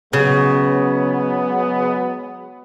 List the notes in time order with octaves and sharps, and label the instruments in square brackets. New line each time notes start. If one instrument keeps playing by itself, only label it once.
[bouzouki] C#3 [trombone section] F#3 G#3 B3